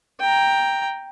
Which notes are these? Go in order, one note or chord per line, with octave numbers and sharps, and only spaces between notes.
G5 A#5